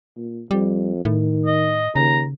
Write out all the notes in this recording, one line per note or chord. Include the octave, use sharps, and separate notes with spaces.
A#2
F2 G3
A2 D#3
D#5
D#2 C#3 A#5